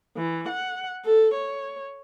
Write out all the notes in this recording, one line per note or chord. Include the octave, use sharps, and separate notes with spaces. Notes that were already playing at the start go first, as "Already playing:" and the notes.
E3
F#5
A4
C#5